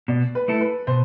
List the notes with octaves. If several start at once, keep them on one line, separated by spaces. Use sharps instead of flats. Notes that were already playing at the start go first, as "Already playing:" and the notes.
B2 D5
B4
A3 E4 A4
B4
B2 C5